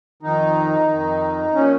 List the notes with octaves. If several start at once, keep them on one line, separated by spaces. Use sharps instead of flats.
F2 D#3 D#4
F2 D#3
A#2 F3 C#4